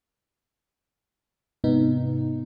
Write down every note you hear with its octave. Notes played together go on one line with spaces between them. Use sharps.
G#2 C3 B3 D#4